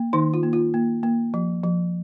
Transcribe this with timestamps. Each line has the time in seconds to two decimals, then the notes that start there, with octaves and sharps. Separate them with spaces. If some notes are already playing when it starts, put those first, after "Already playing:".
Already playing: A#3
0.13 D#3 D#4
0.34 F4
0.43 A#3
0.53 F4
0.74 A#3
1.03 A#3
1.34 F3
1.64 F3